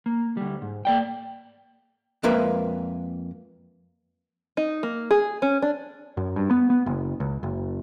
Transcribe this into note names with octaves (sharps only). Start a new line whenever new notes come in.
A#3
D2 G3
G#2
A#3 D5 G5
F2 G#3 A#3 A#4 B4 E5
D#4
A#3
G#4
C#4
D4
F#2
G2
B3
B3
F#1
C#2
F#1